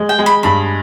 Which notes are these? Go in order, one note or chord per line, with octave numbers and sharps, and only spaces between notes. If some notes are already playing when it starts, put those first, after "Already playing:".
Already playing: G#3
G5
G#3
B5
G2 B5